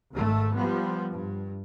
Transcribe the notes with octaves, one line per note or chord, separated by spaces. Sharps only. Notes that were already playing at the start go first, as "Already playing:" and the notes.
G#1 G#2 A3
F3 G3 B3
G2